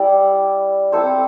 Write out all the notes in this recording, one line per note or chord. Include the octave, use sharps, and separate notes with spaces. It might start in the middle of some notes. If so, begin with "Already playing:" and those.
Already playing: G3 E4 D5
C4 E4 A4 C5